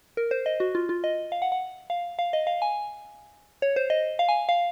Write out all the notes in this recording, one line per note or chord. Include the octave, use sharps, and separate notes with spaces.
A#4
C5
D#5
F#4
F4
F4
D#5
F5
F#5
F#5
F5
F5
D#5
F5
G#5
C#5
C5
D#5
F5
G#5
F5